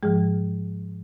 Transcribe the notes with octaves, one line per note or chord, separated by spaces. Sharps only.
G#2 F3 G#3 G#4